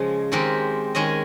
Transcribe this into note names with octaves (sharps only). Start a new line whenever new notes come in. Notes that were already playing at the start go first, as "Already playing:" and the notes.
Already playing: C#3 F3 G#3
D#3 G#3 C4 G4 A#4
D#3 G#3 C#4 G#4 D#5